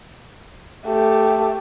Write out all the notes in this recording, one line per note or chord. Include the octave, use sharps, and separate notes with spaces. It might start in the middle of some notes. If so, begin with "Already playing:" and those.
A3 G4